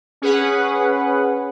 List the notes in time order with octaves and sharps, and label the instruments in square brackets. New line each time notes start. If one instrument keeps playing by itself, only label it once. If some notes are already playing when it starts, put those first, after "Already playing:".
[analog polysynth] C#4 G#4 B4 F#5